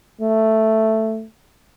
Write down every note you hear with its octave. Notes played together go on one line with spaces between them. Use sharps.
A3